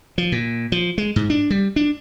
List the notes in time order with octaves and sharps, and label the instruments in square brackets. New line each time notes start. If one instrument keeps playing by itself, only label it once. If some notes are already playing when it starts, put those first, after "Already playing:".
[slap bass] F3
A#2
F3
G#3
G#2
D4
G3
D4